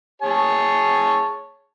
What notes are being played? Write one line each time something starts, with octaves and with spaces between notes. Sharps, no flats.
G#4 C#5 A5